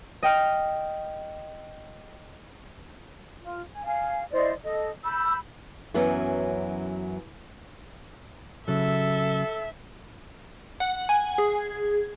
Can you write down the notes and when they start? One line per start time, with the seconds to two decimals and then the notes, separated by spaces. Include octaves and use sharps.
0.23 D#5 G5 F6
3.42 F4
3.71 G#5
3.85 F5 G#5
4.32 E4 C5 D5 D#5
4.63 A4 D#5
5.04 B5 E6 G6
5.94 F#2 E3 F#3 B3 C#4
8.68 C#3 F#3 A4 E5
10.80 F#5
11.09 G#5
11.38 G#4